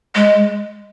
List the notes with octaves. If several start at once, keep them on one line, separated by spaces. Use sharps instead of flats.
G#3